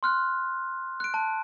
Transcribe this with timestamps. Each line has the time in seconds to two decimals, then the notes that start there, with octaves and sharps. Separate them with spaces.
0.03 C6 F6 F#6
1.00 F#6 D7
1.14 A5